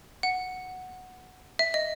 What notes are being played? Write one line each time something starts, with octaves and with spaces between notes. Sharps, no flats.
F#5
E5
D#5